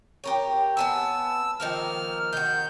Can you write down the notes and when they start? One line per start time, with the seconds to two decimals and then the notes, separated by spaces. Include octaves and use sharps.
0.24 G4 A#4 C#5
0.77 B3 G#5 A5 E6
1.60 D#3 F3 A#3 F6
2.33 D#3 F#4 G6